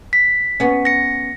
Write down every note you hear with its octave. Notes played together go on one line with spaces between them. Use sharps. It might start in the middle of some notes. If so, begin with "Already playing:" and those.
B6
B3 C#4
A#6 C#7